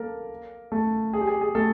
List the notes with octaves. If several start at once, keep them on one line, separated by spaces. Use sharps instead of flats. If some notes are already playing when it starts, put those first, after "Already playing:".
Already playing: A#3 A4 A#4
A3 A4
G#4
G4
G#4
G#4
A3 A4